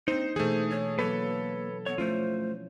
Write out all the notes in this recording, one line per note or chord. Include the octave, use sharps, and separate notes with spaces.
A#3 C4 D4 D#4 C5
B2 E3 A3 G#4 C5
C#5
F#3 A#3 B3 A4 B4 C#5
B3 C#5
F3 A3 C#4 E4 F4 C5